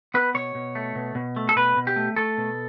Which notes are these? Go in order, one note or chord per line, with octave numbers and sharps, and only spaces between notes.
B3 B4
B2 C#5
B2
A3
B2
B2
A3
A4
B2 B4
B2
G4
A3
A3 A4
B2